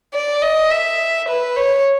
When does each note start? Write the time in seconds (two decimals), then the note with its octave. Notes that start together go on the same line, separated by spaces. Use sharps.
0.14 D5
0.42 D#5
0.70 E5
1.28 B4
1.56 C#5